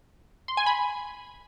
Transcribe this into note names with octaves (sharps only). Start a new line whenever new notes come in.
C6
G#5
B5